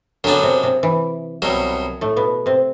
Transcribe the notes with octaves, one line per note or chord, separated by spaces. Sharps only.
F#2 D3 F#3 B3 D4
C3
C3
E3
C2 B2 F#3
A2 A3
B2 B3
C3 C4